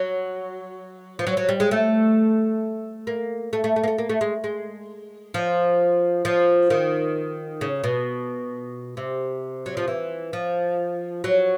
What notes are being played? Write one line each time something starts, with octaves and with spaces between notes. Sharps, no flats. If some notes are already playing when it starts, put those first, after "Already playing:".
Already playing: F#3
F3
F#3
F#3
G3
G#3
A3
A#3
A3
A3
A3
A#3
A3
A#3
A3
G#3
G#3
F3
F3
D#3
C#3
B2
C3
F#3
F3
E3
F3
F#3